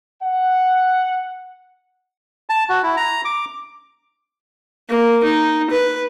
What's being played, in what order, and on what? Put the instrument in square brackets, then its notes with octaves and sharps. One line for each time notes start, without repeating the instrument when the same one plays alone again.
[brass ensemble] F#5
[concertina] A5
F#4
E4
A#5
D6
[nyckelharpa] A#3
D#4
B4